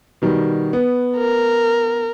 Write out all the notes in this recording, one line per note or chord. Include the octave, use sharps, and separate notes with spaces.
B2 D#3 G3
B3
A#4